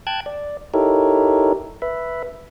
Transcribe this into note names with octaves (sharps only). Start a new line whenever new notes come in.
G5 A5 F#6 G#6
D5
D#4 E4 G4 A4 A#4 C#5
B4 E5